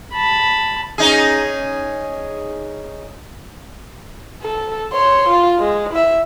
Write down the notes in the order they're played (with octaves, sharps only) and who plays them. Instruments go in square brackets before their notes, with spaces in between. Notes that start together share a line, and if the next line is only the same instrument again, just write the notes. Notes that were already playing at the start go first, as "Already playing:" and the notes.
[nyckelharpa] A5 B5
[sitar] C#4 D#4 G#4
[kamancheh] A4
C#5 C6
F4
G#3
E4 E5